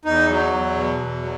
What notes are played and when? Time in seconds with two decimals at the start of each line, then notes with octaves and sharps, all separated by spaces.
0.05 E2 D#4
0.29 F#3
0.52 E2
0.76 B2
1.00 E2
1.22 F#3